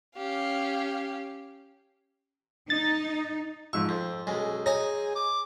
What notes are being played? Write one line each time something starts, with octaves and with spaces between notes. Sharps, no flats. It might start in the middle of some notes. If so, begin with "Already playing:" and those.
C#4 G4 F5
D#4 A6
G#2 F3 C#6 E6
F2 C5
B1 F#2 G#3
D#4 G#4 C#5 D#5 G#5
D6